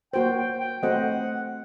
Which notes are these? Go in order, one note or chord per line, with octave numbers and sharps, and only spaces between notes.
A#3 F#4 C5 G5
G5
G5
A3 C4 F#4 C5 D#5 F#5